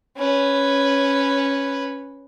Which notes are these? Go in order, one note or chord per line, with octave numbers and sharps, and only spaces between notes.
C#4 B4